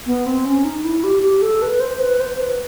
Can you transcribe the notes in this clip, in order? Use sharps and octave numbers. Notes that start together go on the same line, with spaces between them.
B3
C4
C#4
D#4
E4
G4
G4
A4
B4
C5
B4
C5
B4